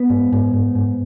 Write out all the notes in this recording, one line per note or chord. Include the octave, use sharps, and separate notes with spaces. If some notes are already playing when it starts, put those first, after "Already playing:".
Already playing: B3
G#2
G#2
G#2
G#2